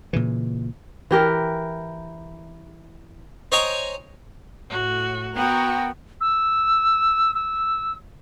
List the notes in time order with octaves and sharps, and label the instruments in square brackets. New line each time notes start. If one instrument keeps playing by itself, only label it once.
[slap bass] A#2 C#3 E3
[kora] E3 G4 A#4
[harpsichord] C5 C#5 D#5 G5 G#5 A#5
[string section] A2 [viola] F#4
[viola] B3 [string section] F#4 A#4 [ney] G5
[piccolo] E6
E6